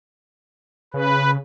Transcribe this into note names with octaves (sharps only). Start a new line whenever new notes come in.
C#3 B4